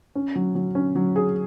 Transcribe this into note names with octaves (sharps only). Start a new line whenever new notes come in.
C#4
F#3
F#3
C#4
F#3
G#4